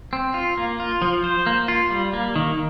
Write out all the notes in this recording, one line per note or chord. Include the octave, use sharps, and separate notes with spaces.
C4
F4
A#3
F4
F3
C5
A#3
F4
G3
A#3
D#3